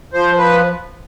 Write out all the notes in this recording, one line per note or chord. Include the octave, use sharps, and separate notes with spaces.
F3 C5
B4